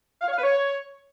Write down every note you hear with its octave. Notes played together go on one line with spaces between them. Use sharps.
F5
C#5
F5
B4
C#5